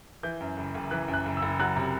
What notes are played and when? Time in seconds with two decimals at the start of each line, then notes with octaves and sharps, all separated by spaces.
0.23 E3 G6
0.40 F#2
0.57 F#1
0.75 F#1
0.91 E3 F#6
1.08 F#2
1.14 F#6
1.26 F#1
1.37 E6
1.42 F#1
1.59 F#3 F#6
1.77 C3